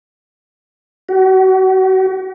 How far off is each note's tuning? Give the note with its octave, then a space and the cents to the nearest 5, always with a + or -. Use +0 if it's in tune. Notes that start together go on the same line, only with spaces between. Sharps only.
F#4 +35